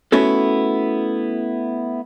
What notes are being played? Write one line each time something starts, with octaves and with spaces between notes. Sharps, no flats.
A3 B3 C#4 E4 F#4 A4